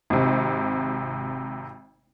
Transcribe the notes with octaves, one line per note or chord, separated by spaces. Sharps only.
G#1 C3